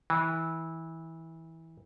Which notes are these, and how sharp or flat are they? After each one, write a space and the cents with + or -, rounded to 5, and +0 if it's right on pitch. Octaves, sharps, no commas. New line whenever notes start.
E3 -20